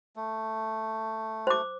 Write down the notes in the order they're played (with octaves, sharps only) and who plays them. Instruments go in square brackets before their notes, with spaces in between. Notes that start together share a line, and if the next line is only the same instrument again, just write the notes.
[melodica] A3
[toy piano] C5 D6